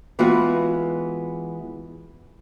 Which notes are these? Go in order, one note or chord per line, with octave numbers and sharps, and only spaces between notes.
E3 G#3 B3 F4 F#4